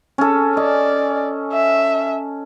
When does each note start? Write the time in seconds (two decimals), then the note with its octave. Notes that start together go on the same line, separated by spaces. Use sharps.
0.18 C#4 A4
0.57 D5 D#5
1.53 E5